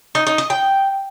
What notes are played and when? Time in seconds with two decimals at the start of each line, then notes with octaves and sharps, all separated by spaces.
0.15 D#4
0.27 D#4
0.38 D#5
0.50 G5